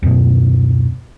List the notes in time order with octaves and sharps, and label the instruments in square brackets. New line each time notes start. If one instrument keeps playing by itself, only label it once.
[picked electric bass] D1 F#2 B2